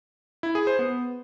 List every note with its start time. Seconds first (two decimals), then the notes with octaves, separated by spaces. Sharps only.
0.43 E4
0.55 G#4
0.67 C5
0.79 B3